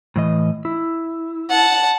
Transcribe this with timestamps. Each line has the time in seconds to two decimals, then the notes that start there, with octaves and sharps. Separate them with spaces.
0.16 A2 E3 D#5
0.65 E4
1.50 F#5 A5